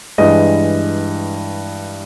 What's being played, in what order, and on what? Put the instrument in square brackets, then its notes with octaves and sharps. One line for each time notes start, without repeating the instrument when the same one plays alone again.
[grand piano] G2 E3 G#3 D#5